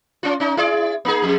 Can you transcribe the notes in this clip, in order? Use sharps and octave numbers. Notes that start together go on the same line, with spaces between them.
C#4 F4
C#4 D#4
E4 G#4 D5
A#3 D#4 G#4
F2 G#4